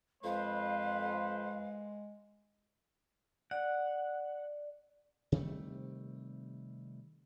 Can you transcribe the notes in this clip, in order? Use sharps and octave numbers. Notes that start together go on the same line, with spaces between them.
F2 G#3 B4 C5 F5
D5 F#5
C3 D#3 G3 A3